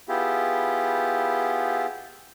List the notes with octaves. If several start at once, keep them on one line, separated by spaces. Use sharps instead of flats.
B3 E4 F4 G4 G#4